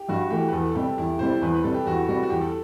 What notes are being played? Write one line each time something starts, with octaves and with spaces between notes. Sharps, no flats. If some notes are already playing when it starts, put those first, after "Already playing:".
Already playing: G4
G2 F#4
E3 A3 G4
B4
E2 A4
A4
C3 G3 G4
E2 E4
C3 G3 C5
E2 B4
B4
C3 G3 A4
G4
E2 F#4
G4
C3 G3 F#4
F#4
E2 G4
A4